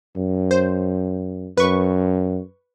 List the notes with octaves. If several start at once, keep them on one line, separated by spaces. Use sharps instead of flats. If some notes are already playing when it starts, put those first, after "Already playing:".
F#2
C5
F#2 B4 C#6